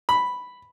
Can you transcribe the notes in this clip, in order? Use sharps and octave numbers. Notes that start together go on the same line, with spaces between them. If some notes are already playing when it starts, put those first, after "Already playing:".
B5